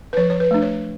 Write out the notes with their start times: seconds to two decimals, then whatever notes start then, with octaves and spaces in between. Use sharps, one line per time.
0.13 B4
0.17 F3 C#5
0.30 C#5
0.40 B4
0.51 A3 D4
0.62 C#5